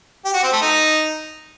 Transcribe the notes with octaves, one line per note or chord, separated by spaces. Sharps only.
G4
F#4
C4
A3
D#4